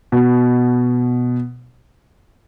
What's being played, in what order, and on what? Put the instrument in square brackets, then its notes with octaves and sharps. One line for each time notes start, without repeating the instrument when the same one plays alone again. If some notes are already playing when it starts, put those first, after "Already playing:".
[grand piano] B2